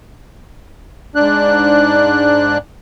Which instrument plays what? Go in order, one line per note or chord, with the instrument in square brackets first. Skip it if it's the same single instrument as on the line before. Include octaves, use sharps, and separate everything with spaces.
[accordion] G#2 D4 F#6